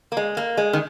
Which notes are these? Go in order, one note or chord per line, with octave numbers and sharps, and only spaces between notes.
A#3
G#3
A#3
G#3
D#3